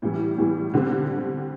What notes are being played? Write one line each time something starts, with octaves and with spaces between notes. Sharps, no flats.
A2 E3 G3
A2 E3 G3
D3 G3 C4